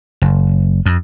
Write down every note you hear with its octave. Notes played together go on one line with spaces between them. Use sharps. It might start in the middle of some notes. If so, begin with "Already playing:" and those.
F#1
F2